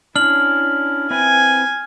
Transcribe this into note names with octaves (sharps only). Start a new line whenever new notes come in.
C#4 D4 E4 F6 F#7
C4 E4 B4 G#5